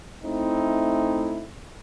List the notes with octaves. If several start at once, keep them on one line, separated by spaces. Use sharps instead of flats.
A3 C4 D#4 E4